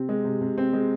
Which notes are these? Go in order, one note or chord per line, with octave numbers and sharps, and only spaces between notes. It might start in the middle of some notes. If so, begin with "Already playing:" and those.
Already playing: C3 C4
G#3
C3
C3
C4
G#3